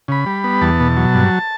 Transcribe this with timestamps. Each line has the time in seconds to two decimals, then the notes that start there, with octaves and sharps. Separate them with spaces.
0.08 C#3 B5
0.26 G3
0.44 B3
0.62 E2 A5
0.80 B2
0.97 F#3
1.15 G2